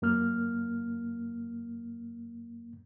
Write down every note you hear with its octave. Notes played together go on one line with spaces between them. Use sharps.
F#2 A#3 F6